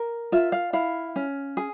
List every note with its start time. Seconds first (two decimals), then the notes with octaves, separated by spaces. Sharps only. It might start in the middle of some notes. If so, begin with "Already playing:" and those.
Already playing: A#4
0.32 F4 E5
0.52 F5
0.73 E4 F5
1.16 C#4
1.57 G#4